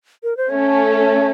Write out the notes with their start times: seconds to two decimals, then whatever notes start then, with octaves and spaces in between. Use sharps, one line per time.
0.23 A#4
0.37 C5
0.50 A3 C#4 A4 C#5